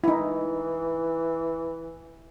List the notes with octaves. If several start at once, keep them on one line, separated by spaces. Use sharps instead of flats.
E3 D#4 E4